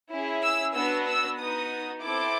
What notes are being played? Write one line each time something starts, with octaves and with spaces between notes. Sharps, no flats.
C#4 E4 G#4
E6
B3 D4 F#4 E6
E6
B3 D#4 F#4 D#6
C4 E4 A4 D6